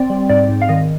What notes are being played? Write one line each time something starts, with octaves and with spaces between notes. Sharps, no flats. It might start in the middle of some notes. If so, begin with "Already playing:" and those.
Already playing: C4 D5
G3
G#2 D5
G#2
F5
D#3 D#5